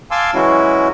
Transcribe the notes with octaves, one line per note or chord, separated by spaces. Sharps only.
F5 G#5 A5 C6 D6 E6
E3 F#3 G#3 C#4 E4 F#4